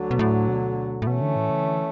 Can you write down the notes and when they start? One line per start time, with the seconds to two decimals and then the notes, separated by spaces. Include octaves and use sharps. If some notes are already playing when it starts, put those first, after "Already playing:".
Already playing: D2 D3 F#3
0.11 B2
0.19 A2
0.48 B2
1.02 A2
1.07 B2 E3 A3 C#4
1.21 D3
1.36 A2
1.50 C#3
1.65 D3